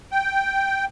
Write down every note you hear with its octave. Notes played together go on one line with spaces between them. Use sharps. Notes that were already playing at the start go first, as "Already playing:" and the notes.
G5